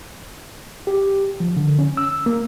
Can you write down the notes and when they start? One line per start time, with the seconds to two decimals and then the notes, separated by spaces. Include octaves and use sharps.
0.87 G4
1.40 F3
1.57 D3
1.79 C#4
1.97 E6
2.26 A#3